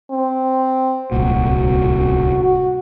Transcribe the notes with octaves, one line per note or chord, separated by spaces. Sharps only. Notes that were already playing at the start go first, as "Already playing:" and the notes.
C4
D1 C2 A#2 F#4
F#4